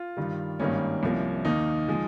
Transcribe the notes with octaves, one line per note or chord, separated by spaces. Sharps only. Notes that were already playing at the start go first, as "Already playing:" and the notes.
Already playing: F4
G2 D#3 G3
G#1 G2 D#3 G3 A#3 C#4
C2 C3 F3 A#3
D#2 D#3 A#3 D#4
F3 G#3